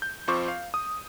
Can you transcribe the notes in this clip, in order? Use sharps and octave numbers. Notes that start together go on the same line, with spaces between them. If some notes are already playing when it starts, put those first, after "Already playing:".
G6
F2 C4 F4 C5 C#6 D6
F5
D#6